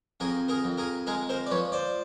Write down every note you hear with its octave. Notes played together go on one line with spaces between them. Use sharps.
F2 G#4 A#4
G#4 A#4
F2
G#4 A#4
G#3 G#4 A#4
A#4 C5
D5
F3 B4 C#5
C5 D5